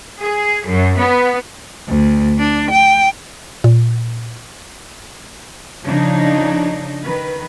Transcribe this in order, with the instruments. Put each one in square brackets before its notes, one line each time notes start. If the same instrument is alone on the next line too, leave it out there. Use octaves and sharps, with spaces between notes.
[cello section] G#4
F#2
B3
[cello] D2
D4
G5
[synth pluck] A#2
[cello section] C#3 F3 D4 D#4
D#3 B4